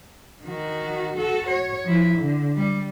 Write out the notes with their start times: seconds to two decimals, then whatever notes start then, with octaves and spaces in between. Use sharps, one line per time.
0.44 D#3 F#4
1.17 F#4 A4
1.47 C#5
1.84 F3 E4
2.17 D3
2.56 G3